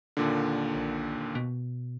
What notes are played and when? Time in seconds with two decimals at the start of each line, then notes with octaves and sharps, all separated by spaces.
0.17 D#2 A#2 D3
0.75 A#1
1.35 B2